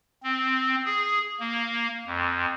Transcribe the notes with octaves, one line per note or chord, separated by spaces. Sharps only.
C4
G#4
A#3
F2